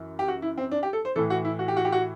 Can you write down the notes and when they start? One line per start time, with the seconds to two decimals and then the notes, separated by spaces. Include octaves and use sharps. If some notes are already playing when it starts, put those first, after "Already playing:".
Already playing: F#2 E3
0.19 G4
0.28 F#4
0.42 E4
0.58 C4
0.71 D4
0.83 G4
0.93 A4
1.05 C5
1.16 A2 E3 A4
1.30 F#4
1.45 E4
1.59 F#4
1.68 G4
1.77 F#4
1.85 G4
1.92 F#4